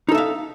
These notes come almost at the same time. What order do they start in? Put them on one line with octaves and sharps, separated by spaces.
D#4 A4 E5 F5